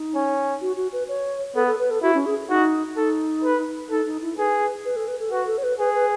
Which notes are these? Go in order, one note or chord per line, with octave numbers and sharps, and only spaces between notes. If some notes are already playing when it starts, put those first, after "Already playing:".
Already playing: D#4
C#4
F#4
F#4
B4
C#5
B3 A4
A4
B4
A4
E4 F#4
C#4
G#4
D#4 F#4
D#4 A4
B4
D#4 A4
D#4
E4
G#4 B4
B4
A4
B4
A4
F#4 B4
A4
C#5
B4
G#4 B4
B4